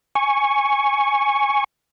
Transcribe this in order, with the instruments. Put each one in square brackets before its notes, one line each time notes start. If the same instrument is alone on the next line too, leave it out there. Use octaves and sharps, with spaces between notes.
[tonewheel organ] G#5 C#6